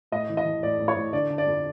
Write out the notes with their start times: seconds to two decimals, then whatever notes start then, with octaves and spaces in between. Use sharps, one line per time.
0.12 A2 D#5
0.30 E3
0.37 D#5
0.46 E3
0.63 A2 D5
0.79 A2
0.88 C#5
0.96 A2
1.13 D3 D5
1.30 D3
1.38 D5
1.46 F2